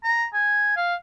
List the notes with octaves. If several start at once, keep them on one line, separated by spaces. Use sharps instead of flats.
A#5
G#5
F5